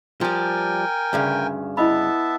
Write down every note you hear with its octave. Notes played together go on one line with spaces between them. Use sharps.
F3 G3 A#4 G5 G#5
D2 G2 C#3
B3 E4 D#5 E5 A5 B5